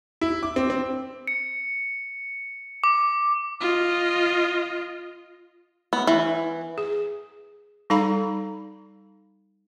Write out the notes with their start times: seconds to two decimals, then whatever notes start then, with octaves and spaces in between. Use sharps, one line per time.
0.21 E4
0.43 D6
0.56 C4
0.70 C4
1.27 C#7
2.84 D6
3.61 F4 D#5
5.93 B3
6.07 E3
6.78 G#4
7.90 G3 D#4 A4 F5 A#5 B5